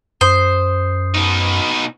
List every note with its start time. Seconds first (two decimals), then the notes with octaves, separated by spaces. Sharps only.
0.21 F#2 C5 D#6
1.14 B2 D#4